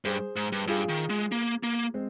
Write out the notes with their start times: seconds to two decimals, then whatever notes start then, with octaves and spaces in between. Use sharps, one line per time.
0.05 G2 G#4 C5
0.36 G#2
0.52 G2
0.67 G2 F4 G#4
0.89 D#3
1.10 G#3
1.32 A#3
1.63 A#3
1.94 G#3 C4